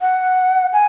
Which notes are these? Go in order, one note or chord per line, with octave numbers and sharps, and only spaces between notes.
F#5
G#5